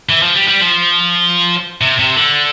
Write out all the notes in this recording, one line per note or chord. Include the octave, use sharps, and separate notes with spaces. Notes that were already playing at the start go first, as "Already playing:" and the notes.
E3
F3
G3
G3
F3
C3
C3
D3